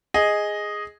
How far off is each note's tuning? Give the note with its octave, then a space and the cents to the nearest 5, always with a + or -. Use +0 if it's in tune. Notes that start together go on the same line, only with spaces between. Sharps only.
G#4 +0 D#5 +0